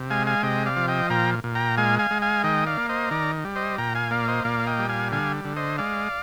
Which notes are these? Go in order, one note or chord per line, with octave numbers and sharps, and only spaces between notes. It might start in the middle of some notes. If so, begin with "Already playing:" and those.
Already playing: C3
G#3 F5 G#5
F5 G#5
C3 D#5 G5
D5 F5
F3
D#5 G5
A#2 G5 A#5
A#2
G5 A#5
G#3 F5 G#5
F5 G#5
G#3
F5 G#5
D#3 D#5 G5
D5 F5
A#3
C5 D#5
D#3 A#4 D5
G3
C5 D#5
A#2 G5 A#5
F5 G#5
A#3 D5 F5
C5 D#5
A#2 D5 F5
F5
D#5 G5
G3
F5 G#5
D3 F5 G#5
D3
C5 D#5
G#3 D5 F5